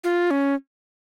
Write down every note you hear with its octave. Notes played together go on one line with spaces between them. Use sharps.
F4
C#4